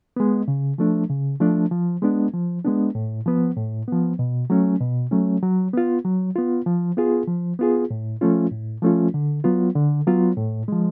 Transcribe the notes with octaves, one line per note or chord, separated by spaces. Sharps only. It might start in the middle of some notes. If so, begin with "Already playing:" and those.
G#3 B3
C#3
F3 A3 D4
C#3
F3 A3 D4
F3
G#3 B3 D4
F3
G#3 B3 D4
A2
F3 B3
A2
F3 B3
B2
F#3 A3 C#4
B2
F#3 A3 C#4
F#3
B3 F4
F#3
B3 F4
F3
B3 F4 G#4
F3
B3 F4 G#4
A2
F3 A3 C#4 F4
A2
F3 A3 C#4 F4
D3
F#3 B3 F4
D3
F#3 B3 F4
A2
F3 G#3